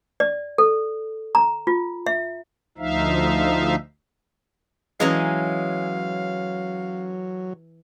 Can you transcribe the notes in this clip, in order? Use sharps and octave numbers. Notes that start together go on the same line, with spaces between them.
D5
A4
A#5
F4
E5
D2 F3 D#4 E5 F5
E3 F#3 G#3 C#4 D#5 F5 A#5